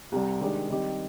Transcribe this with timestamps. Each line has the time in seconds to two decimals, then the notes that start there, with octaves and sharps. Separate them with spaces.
0.12 C2 C3 G3
0.41 D#3 G#3 D4 G4 D5
0.70 D#3 G3 C4 D#4 G4